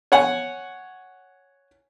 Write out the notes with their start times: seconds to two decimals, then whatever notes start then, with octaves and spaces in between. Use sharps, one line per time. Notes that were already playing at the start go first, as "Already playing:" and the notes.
0.12 C#5 F#5 G#5